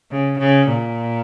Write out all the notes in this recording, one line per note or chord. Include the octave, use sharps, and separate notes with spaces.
C#3
C#3
A#2